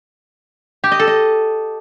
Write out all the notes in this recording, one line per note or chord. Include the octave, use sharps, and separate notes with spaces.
G4
D#5
A4
D#5